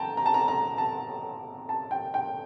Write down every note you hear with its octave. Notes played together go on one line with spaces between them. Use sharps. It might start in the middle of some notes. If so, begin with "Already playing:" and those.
Already playing: G5 A5 A#5
A#5
A5
A#5
A#5
A5
A5
G5
G5